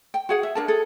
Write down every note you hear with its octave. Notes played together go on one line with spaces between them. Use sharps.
G5
F#4 G#4 F#5
E5
D4 A#4 A5
G#4 A4